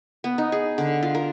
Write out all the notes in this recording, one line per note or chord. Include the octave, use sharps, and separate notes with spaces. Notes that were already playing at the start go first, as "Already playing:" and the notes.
B3
D#4
G#4
D3
F4
A#4